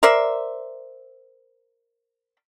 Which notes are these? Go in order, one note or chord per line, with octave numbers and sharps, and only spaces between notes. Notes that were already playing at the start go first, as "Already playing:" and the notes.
A#4 C5 D5 E5